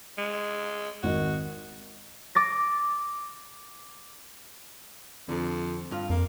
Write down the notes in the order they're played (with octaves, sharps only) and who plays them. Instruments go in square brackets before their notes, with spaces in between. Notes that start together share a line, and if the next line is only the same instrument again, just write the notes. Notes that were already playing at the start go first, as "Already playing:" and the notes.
[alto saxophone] G#3
[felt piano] G#1 D#3 D#5 [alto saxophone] F#4
[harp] D6 A6 A#6
[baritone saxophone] F2 [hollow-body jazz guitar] D3
[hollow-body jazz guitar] G2 F4
[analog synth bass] F2 [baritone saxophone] A#3